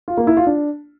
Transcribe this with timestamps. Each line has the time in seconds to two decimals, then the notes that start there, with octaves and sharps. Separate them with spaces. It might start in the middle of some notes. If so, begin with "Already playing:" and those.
0.08 F4
0.17 A#3
0.27 E4
0.37 F4
0.47 D4